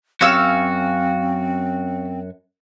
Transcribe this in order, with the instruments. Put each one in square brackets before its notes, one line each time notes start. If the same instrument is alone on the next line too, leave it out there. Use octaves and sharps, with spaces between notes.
[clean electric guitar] F#2 F#4 [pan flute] C4 [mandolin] C#4 F5 E6